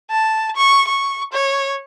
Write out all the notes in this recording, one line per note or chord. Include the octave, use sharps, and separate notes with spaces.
A5
C#6
C#6
C#5